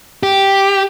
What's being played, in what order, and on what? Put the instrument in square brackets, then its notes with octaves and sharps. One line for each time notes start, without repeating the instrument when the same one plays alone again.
[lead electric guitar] G4